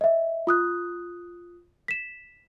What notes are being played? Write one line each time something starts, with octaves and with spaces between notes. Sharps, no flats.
D#5 E5
F4 D#6 F#6
B6 E7